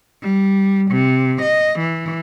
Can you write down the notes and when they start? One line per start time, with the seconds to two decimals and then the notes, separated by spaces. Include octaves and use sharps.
0.22 G3
0.91 C3
1.42 D#5
1.80 E3